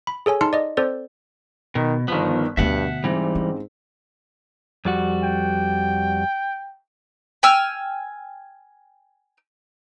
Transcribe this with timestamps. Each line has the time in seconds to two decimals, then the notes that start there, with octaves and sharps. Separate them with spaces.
0.07 B5
0.26 G#4 A4 C#5 G#5
0.41 D#4 A5 C6 F6 C#7
0.53 D5 D#5
0.77 C4 A4 C5 D5
1.75 B2 D#3
2.08 G1 D#3 F3 B3 B6
2.57 D2 G2 B2 A3 E5 F#5
3.04 G#2 E3 G3 C4
3.35 C#4
4.85 F2 G3 F#4
5.23 G5
7.43 G5 G#5 E6 F6